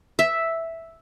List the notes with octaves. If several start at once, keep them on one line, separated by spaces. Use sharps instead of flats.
E5